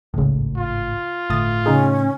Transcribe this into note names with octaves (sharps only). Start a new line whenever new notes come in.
G#1 C#2 A2 C#3
F4
G1 A2 D#6 A6
C#3 C#4 D#4 G#4